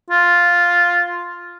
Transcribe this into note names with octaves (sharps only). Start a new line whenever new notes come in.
F4